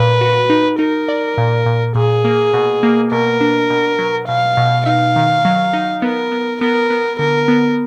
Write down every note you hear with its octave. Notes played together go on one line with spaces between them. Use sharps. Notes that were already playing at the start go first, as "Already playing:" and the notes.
Already playing: A#2 B4
F#4
D#4
D#4 A#4
D5
A#2
A#2
A#2 G#4
A#3
B2
A#3
B2 A#4
D4
B2
F#3
B2 F5
B2
D#4 F5
D#3
F#3
D#4
B3 A#4
B3
B3 A#4
B3
D3 A#4
B3